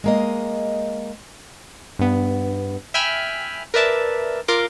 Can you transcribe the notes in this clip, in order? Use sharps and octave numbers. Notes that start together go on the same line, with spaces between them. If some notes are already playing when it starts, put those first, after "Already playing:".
G#3 A#3 D#5
G2 B3
E5 G5 G#5 B5 F6
A#4 B4 D5 E5 A5
F4 A#4 C6 D6